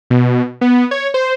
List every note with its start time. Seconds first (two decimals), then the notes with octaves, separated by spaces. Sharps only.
0.10 B2
0.61 B3
0.91 C#5
1.14 C5